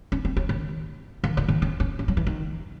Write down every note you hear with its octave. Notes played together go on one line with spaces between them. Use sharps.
C#4
C4
C#4
D#3
D#3
D#3
D#3
C#4
C#4
C#4
F#3
E3
D#3